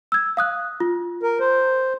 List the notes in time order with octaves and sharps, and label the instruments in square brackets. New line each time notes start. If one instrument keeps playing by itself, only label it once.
[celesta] E6 G#6
F5 D#6 F#6
F4
[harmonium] A#4
C5